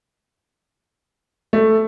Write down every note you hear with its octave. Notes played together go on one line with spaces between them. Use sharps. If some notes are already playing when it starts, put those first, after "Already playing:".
A3